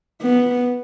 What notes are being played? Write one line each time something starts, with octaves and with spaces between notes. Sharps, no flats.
B3